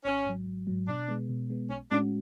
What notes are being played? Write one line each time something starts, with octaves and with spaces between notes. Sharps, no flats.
G#1 C#4
G#2 F#3
G#1
G#2 F#3
B2 D4
G#3 B3
B2
G#3 B3
B1 C#4
A2 G#3 C#4 D4 F#4